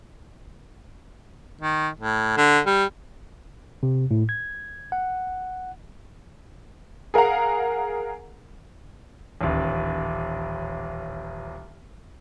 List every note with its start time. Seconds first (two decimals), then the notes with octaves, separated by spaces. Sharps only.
1.62 D#3
2.00 A2
2.37 D3
2.66 G3
3.83 C3
4.11 A2
4.29 G#6
4.92 F#5
7.14 G#4 A#4 F5 F#5 A#5
9.41 D#1 A1